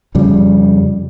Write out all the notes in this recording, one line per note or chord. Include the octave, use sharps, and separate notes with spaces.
F2 C#3 G3